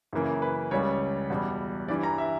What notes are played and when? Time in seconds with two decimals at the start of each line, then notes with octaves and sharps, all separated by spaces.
0.13 F#2 C#3 E3 A#3
0.42 B4
0.71 C#2 C#3 G3 C#5
1.30 E2 B2 G3
1.88 G2 E3 G3 D5
2.03 A#5
2.18 E5